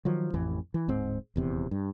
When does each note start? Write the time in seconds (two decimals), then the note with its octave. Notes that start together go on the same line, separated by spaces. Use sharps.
0.05 D#3 F3 F#3
0.34 A1 F2 E3
0.74 E3
0.88 D1 G#2 C4
1.36 D#1 E2 C3
1.71 G2